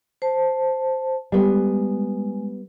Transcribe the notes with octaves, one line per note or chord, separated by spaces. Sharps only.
C5 A5
G3 G#3 B3